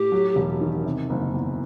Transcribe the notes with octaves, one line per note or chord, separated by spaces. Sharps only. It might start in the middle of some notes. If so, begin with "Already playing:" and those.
Already playing: A2 G4
F#3
E1
D#3
C3
F#1
E2